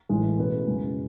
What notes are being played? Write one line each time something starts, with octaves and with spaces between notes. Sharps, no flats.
A1 A2 E3 G#3
B2 A3 C#4 G#4 B4
F#1 F#2 C#3 G#3